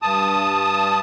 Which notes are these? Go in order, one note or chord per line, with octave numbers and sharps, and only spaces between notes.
G2 A5 D#6